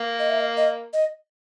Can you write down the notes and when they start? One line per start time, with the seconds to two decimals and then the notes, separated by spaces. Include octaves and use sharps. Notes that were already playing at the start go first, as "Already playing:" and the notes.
Already playing: A#3
0.19 D#5
0.30 E5
0.40 D#5
0.57 D#5
0.93 D#5